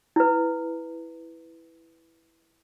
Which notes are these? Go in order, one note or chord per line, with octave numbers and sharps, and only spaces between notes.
E4 B4